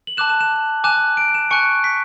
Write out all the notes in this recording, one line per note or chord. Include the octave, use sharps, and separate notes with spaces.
F#7
A5 D6 F#6 E7
E7
E7
G#5 D6 F#6 E7
D7
E7
G#5 C#6 F#6 C#7
B6